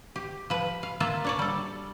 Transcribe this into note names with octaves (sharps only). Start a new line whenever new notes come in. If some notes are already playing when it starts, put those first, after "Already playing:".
G4
F3 B4
F5
A#3 F4 E5 A5
D4 C#5 D5
G3 A4